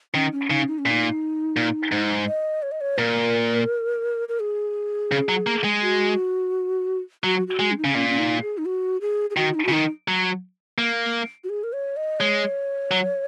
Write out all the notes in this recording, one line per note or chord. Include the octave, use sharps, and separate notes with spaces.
D#3 C#4
C#4
C#3 D#4
D#4
C#4
A#2 D#4
A#2
G#2
D#5
C#5
D#5
C#5
A#2 A#4
A#4
G#4
C#3
F#3
A#3
G#3
F#4
F#3 F#4
F#4
G#3
C#4
D#4
C#3 C#4
A#2 C#4
C#4
D#4
G#4
D#4
F#4
G#4
G#4
D#3 F#4
D#4
F#4
C#3
D#3 D#4
F#3
A#3
F#4
G#4
A#4
C#5
D#5
G#3 C#5
F#3